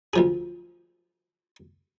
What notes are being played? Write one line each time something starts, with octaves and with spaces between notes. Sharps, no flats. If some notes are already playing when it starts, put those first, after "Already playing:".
D2 F3 G#4